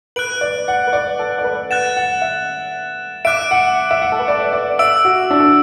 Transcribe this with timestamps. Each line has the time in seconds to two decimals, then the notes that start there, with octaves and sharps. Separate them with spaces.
0.16 B4 F#6 D7 F#7
0.41 D5
0.68 F#5
0.87 B4
0.93 D5
1.19 A4
1.38 D5
1.44 B4
1.70 F#5 F#6 A6 E7
1.97 F#5
2.22 E5
3.25 E5 D6 F#6 D7
3.51 F#5
3.91 E5
4.02 F#5
4.12 A4
4.19 B4
4.28 D5
4.53 D5
4.79 E5 E6 D7 F#7
5.05 F#4
5.30 D4
5.40 A4